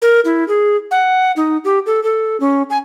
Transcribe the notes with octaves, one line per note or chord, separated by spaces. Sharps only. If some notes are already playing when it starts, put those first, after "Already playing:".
A#4
E4
G#4
F#5
D#4
G4
A4
A4
C#4
G#5